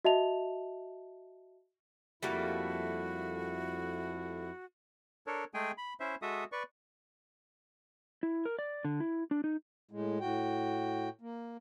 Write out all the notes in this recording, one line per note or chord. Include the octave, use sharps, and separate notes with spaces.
F#4 D#5 E5 A5 F7
F2 G3 A3 A#3 E4 F#4
D4 A4 A#4 C#5
G#3 A3 G#4 G5 G#5
B5
C#4 E4 C5 E5
G#3 F#4 A4 E5 D#6
B4 D5 C#6
E4
A#4
D5
D3
E4
D4
D#4
A2 G#3
A2 F#4 G5
A#3